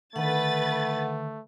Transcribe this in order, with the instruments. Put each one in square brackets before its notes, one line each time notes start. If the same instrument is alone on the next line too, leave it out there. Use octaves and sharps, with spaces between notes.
[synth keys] D3 D#3 [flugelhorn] A3 [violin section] B4 A6 [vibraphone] F#5